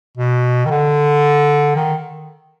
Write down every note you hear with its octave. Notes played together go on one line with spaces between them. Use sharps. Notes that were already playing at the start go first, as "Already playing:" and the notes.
B2
D#3
D3
D#3